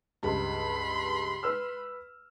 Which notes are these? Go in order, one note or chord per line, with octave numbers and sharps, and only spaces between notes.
C#2 G2 B5 C6
B4 E6 F6